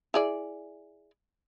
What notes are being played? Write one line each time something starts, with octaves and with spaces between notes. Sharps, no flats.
E4 G#4 D5